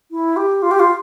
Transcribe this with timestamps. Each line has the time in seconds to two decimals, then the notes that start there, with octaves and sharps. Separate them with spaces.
0.11 E4
0.36 G4
0.62 F4
0.71 G4
0.79 F4